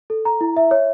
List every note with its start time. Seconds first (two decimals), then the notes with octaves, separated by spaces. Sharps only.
0.10 A4
0.25 A#5
0.41 E4
0.57 E5
0.71 C#5